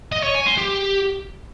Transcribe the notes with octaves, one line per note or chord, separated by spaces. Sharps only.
D#5
C#5
G#5
C5
G4